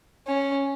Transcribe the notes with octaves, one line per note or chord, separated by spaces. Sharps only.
C#4